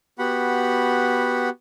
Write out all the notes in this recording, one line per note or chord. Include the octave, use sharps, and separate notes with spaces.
B3 F#4 G4 F#5 B5